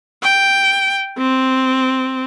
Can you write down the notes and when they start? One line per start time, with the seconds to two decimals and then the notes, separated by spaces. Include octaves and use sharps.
0.23 G5
1.18 C4